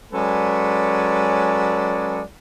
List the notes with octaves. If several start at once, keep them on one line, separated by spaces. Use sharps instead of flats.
F#3 G#3 C#4 A4 B4 D5